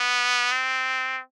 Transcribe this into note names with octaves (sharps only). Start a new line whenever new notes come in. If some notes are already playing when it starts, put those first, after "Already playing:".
Already playing: B3
C4